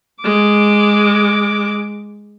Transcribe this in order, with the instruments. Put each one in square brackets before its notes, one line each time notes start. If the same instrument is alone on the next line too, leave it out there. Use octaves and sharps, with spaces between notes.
[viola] G#3 D6